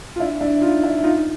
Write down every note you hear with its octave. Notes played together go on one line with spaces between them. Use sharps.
F4
D4 E4
D4 E4
D#4 F4
D4 E4
D#4 F4